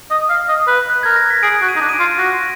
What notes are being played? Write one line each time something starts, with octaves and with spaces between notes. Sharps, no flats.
D#5
F5
D#5
B4
F#6
A#4 G#6
A#6
B6
G#4 D7
F#4
D#7
D#4
D4
D#7
D7
F4
F#4 A#6